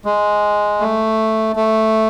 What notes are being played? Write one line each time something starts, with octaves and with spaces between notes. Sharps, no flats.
G#3
A3
A3